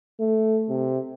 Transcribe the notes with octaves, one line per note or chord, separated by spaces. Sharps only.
A3
C3